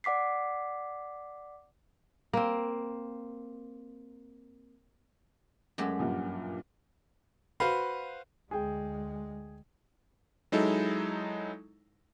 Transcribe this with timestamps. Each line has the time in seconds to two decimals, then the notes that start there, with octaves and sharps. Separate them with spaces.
0.04 D5 F#5 D6 B6 C7
2.33 A#3 C4
5.78 F#2 F#3 G#3 A3 G4
5.99 A#1 G2 A#2
7.60 F#4 B4 C5 F5
8.51 D2 G#3 G#4 G5
10.52 F#3 G#3 D#4 E4 A4